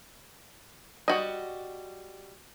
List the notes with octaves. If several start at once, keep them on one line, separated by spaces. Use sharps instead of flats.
G3 F#4 D#5